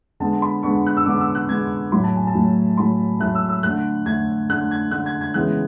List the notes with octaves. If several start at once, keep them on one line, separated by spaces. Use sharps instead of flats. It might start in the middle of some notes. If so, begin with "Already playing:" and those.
D3 G#3 B3 A5
B5
D3 G#3 B3 C#6
F#6
E6
D3 G#3 B3 D6
E6
F#6
D3 G#3 B3 G#6
A2 F#3 A3 B5
A5
G#5
A5
A2 F#3 A3
A2 F#3 A3 B5
A2 F#3 A3 F#6
E6
E6
D3 A3 F#6
D3 A3 G#6
D3 A3 F#6
G#6
D3 A3 F#6
G#6
G#6
C#3 E3 G#3 B3 F#6